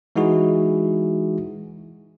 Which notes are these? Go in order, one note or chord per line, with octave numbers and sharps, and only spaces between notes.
E3 G#3 D#4 E4 F#4 G#4